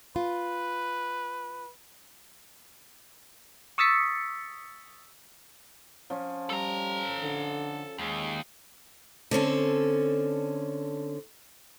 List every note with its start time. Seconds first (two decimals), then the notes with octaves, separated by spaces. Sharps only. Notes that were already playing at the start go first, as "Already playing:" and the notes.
0.16 F4 B4
3.78 C#6 D#6 E6 A6 B6 C#7
6.10 F3 C#4
6.50 G3 A4 A#5
7.22 D3
7.98 D#2 G#3
9.31 D3 C4 C#4 A4